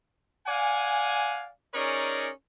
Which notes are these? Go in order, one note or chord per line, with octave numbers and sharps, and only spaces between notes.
D5 F5 F#5 G#5
C#4 D#4 G#4 A#4 C#5 D5